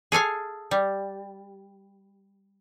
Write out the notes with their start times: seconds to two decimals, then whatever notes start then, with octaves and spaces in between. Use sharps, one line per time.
0.12 G#4 A4 F5 G#5
0.71 G3